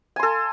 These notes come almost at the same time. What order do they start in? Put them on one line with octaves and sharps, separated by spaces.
G#5 C6 A4